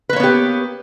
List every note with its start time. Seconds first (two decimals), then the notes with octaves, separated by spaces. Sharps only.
0.09 B4
0.13 A#3
0.16 C#5
0.20 B3
0.23 G4